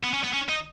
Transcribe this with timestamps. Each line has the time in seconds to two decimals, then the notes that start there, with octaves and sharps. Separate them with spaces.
0.03 B3
0.13 C#4
0.23 B3
0.33 C#4
0.49 D#4